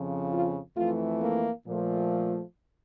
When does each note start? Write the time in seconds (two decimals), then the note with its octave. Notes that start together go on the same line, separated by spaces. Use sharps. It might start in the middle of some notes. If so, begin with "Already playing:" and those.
Already playing: F2 C#3 F3
0.31 F4
0.76 F2 E3 A3 F4
1.22 A#3
1.67 A#2 F3 A3